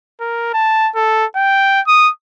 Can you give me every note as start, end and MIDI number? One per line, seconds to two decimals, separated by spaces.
0.20 0.52 70
0.54 0.90 81
0.95 1.25 69
1.36 1.81 79
1.87 2.10 87